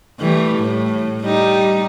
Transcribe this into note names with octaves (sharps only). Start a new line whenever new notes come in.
E3 G3 A3
A2
G3 D#4